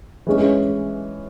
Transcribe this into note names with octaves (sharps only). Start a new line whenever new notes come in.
E3 G#3 C#4